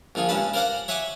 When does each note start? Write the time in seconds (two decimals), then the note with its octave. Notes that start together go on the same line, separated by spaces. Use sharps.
0.15 A#1 D3 F4 G#4
0.29 G2 C#3 G#3 C#4 A5 B5
0.54 A#4 C5 D5 F5 F#5 A#5
0.88 C#5 E5 F#5 G#5 C#6 D6